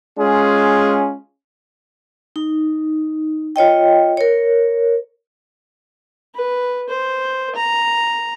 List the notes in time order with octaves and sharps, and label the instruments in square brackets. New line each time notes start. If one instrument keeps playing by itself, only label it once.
[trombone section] G#3 C#4 F4 G#4
[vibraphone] D#4
F4 C#5 D#5 G5
A#4 C#5
[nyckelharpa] B4
C5
A#5